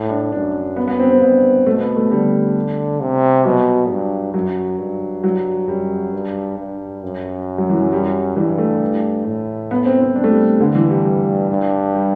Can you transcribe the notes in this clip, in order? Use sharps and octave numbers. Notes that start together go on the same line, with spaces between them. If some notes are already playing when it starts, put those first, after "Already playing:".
Already playing: A2
D4
F#2 D4
B3
B3
C4
C4
G2 B3
B2 A3
B3
A3
D3 G3
C3
B2 F#3
G2
F#2 F#3
G2
F#3
F#2 G3
G2
G2
F#2
F#3
E3
E3
G3
G2 E3
A3
A2
B3
C4
C4
D4
A3
G3
G2 D3
E3
G3
G3
G2
G3